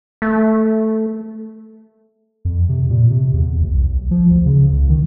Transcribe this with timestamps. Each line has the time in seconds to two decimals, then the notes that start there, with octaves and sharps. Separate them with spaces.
0.22 A3
2.45 F2
2.69 C3
2.90 A#2
3.10 C3
3.33 E2
3.61 D2
3.73 B1
4.11 F3
4.31 D2
4.46 C#3
4.72 C#2
4.89 D#3